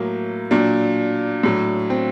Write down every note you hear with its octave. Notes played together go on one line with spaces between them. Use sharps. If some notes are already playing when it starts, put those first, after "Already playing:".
Already playing: A2 F#3 A#3
A#2 F#3 D4
A2 F#3
C4